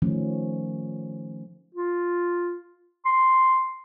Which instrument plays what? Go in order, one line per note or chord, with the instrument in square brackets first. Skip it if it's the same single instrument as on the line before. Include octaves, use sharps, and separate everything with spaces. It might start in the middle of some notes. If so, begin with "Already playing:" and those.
[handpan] D#3 F3 A3 C#4
[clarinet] F4
C6